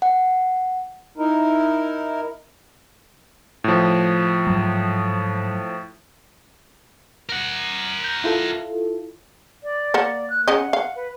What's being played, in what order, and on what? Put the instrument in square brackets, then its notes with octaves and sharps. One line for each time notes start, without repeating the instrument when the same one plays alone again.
[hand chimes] F#5
[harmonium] D#4 E4 A#4
[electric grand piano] A2 F3
[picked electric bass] G#2 F#3
[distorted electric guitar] A#4 F#5
[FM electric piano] G6
E4 F4 A4
[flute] D5
[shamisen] A#3 F#5
[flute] F#6
[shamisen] C#3 D#5 [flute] F#5
[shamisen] F5
[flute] B4